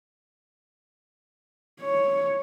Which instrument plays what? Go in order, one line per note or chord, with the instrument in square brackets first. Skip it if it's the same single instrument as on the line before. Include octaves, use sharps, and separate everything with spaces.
[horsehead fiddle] C#5